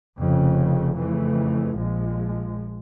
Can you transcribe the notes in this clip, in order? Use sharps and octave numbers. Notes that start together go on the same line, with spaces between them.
F1 F2 C#3
F2 C#3 E3 A3
A#1 A#2 F3 G#3